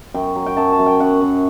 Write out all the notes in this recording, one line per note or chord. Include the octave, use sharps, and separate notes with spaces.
F#2 G5
F#3
G5
F#2 A5
A5
F#2
G5
F#2 F#5
F#2